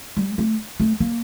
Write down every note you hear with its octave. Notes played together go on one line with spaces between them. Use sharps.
G3
A3
A3
A#3